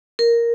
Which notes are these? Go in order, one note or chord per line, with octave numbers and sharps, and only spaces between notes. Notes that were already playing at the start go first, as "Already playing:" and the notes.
A#4